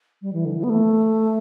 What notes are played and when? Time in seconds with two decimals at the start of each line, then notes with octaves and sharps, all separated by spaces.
0.22 G3
0.33 E3
0.45 D3
0.57 E3
0.64 B3
0.69 A3